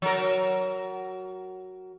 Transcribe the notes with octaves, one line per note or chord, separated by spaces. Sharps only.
F#3 A#4